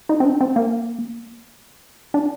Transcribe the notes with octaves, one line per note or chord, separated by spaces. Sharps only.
D#4
C4
D4
C4
A#3
D4